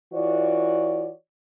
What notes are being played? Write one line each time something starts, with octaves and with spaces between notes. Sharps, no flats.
E3 F4 F#4 C#5 D5